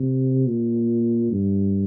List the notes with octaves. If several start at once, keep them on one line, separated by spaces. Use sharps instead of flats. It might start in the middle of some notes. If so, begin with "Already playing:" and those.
Already playing: C3
A#2
G2